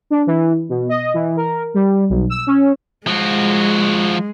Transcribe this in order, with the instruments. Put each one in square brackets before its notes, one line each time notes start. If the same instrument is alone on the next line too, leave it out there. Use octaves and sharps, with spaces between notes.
[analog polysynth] D4
E3
B2
D#5
E3
A#4
G3
B1
E6
C#4
[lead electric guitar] F3 F#4 [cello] G#3